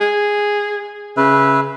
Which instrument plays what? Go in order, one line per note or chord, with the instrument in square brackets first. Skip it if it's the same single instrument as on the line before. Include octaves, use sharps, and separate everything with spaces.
[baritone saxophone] G#4
[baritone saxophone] C#3 [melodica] B4 E5